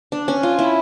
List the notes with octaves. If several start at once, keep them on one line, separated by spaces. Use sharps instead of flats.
D4
C#4
F4
E4